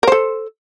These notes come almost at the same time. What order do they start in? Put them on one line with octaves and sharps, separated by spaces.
A#4 C5 A4